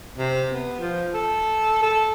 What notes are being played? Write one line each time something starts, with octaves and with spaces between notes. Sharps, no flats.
C3
B3
F3
A4
A4